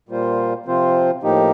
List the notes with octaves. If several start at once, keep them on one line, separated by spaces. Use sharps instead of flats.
A#2 G3 A#3 F4 C5
C3 F3 C4 F4 C5
A2 F3 A#3 D#4 G4